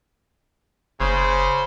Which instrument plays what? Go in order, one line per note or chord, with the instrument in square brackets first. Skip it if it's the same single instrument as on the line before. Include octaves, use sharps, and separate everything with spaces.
[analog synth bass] F#1 [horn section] C#3 C5